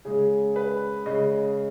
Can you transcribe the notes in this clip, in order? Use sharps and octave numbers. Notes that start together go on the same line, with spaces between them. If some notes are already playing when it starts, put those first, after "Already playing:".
C#3 G#3 G#4
B4
C#3 G#3 D#5